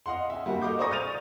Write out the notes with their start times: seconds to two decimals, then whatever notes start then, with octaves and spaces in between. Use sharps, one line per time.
0.06 D#5 F5 F#5 C6
0.30 E5 G#5
0.46 G3 A#3 F#4
0.61 A4 D#5 F5 D6 G6
0.79 C5 D5 A#5 C#6 D#6 A#6
0.91 F6 G6 A6 D#7 F7